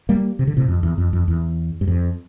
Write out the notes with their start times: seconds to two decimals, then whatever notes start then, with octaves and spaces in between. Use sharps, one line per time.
0.09 G3 A#3
0.39 C3
0.47 D3
0.57 A2 C3
0.68 F2
0.83 E2
0.98 F2
1.13 F2
1.28 E2
1.81 G2
1.88 F2